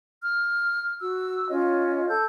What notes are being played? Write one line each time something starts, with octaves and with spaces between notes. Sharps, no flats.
F6
F#4 E6
C#4 F4 C#5 D#5
A4 G6